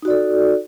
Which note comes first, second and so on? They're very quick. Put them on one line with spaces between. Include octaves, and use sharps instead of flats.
D#4 F#4 D5 A4